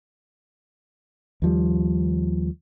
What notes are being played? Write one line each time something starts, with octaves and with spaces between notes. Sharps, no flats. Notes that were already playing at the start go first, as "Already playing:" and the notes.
D#2 F3 G3